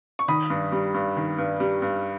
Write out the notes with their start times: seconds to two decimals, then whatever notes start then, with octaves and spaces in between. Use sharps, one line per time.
0.19 C#6
0.28 D#3 B5 D#6
0.50 G2
0.72 G3
0.94 G2
1.17 D#3
1.38 G2
1.60 G3
1.82 G2